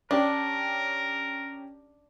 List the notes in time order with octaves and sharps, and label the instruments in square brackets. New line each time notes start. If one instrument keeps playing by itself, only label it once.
[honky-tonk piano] C#4 G4 [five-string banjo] D4 [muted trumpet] A#4